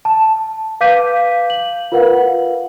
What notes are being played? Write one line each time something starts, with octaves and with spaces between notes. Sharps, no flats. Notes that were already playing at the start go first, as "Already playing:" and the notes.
A5
B4 F5 D6 G6 B6 D#7
F#7
F4 A#4 B4 F5 F#5